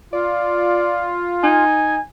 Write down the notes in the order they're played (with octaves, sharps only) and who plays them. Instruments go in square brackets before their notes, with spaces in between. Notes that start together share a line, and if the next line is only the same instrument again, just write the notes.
[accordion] F4 [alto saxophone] D5
[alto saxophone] D#4 [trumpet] G#5